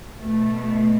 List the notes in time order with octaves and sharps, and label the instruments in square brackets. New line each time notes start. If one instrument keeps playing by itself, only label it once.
[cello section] B2 A3